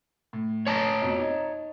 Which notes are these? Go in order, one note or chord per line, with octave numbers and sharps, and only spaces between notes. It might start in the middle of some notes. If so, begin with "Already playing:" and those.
A2
C#5 A5 A#5
F2 B2
D#4